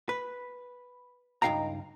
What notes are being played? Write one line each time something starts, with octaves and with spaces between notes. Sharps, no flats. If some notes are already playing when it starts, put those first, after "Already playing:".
B4
C#2 G2 D#4 F5 G5 A#5